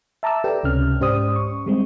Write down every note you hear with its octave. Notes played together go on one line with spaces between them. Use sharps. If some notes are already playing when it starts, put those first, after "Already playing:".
E5 A5 A#5 D6 E6
G4 A4 B4 D5 G5
C#2 C3 C#4 F6
G#2 C#4 G4 C5 D5 D#6
C#6
G3 G#3 C4